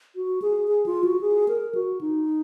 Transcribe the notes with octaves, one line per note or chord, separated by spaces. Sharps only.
F#4
G#4
G#4
F4
F#4
G#4
A#4
F#4
D#4